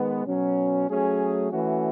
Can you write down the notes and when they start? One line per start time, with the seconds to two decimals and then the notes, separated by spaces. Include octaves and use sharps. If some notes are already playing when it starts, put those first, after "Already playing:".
Already playing: D#3 G#3 B3
0.25 B2 F#3 C#4
0.88 F#3 A3 C#4 G#4
1.52 E3 A3 C#4 F#4